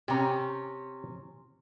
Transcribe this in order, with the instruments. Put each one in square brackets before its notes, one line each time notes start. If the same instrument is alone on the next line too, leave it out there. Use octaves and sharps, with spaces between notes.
[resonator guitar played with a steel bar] C3 C#4 [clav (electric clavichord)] G4 A#5